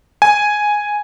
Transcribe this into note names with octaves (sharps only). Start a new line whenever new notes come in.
G#5